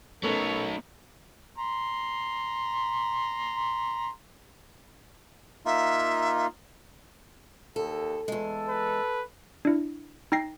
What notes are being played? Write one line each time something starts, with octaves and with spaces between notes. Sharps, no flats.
A3 B3 C#4 D#4 A4 A#4 C#5
A#5 C6
A#3 D#4 F4 E5
D#2 A4
E2 G#3 A4
B4
D4 E4
D#4 G5 A#6 C7